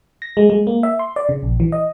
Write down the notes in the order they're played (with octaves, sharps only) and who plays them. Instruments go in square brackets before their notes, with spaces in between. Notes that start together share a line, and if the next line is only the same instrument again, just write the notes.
[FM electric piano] A#6
G#3
G#3
A#3
E5
C6
D5
C#3
A#1
E3
D#5